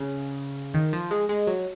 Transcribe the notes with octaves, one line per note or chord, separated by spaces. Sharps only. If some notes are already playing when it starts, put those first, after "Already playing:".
Already playing: C#3
D#3
F3
G#3
G#3
F#3